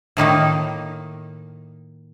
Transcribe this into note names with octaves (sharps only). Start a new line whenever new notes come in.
A2 D#3 A#3 D#4